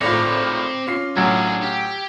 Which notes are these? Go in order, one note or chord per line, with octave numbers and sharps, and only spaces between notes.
G#1 A2 C4 F4 A#5 D6 A#6 C#7
C#4 F4 C7
A1 F#3 D4 G#4 G#6
G4